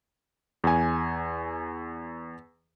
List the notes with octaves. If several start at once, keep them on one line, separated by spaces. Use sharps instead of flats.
E2 G#5